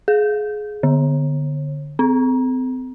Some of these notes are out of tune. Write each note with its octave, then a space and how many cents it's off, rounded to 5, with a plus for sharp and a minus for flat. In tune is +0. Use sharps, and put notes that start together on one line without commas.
G#4 +20
D3 +5
C4 -35